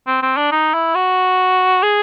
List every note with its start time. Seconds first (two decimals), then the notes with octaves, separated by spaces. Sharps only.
0.07 C4
0.22 C4
0.37 D4
0.52 D#4
0.74 E4
0.95 F#4
1.83 G#4